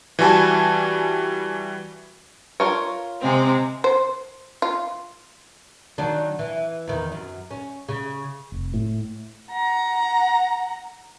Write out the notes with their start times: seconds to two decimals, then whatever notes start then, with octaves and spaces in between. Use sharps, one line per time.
0.19 E3 G3 F#4 G#5 A5
2.60 F4 A#4 C#5
3.21 C3 G#3 C4
3.84 C5
4.62 F4
5.98 D#3 F#3 D4
6.39 E3
6.88 E2 D#3
7.12 F#2
7.51 C#4
7.89 C#3
8.52 F1
8.74 A2
9.51 F#5 A#5